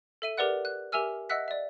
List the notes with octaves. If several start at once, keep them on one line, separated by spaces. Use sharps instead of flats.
A4 E5 D#7
G4 A#4 B4 D5 F#5 F#6
F#6
G4 A#4 E5 G#5 E6 F6
D#5 E5 F#5 E6 F#6 B6
D5 E5